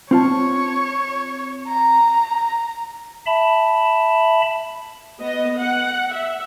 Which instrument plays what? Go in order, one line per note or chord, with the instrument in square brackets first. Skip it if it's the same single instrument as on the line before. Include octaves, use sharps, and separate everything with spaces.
[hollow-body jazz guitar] C4 F4 A5 [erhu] C#5
[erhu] A#5
[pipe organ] E5 A5 B5
[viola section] B3 D#5
F#5
E5